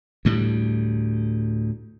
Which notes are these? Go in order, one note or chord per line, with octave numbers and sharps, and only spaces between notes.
D2 A2 G3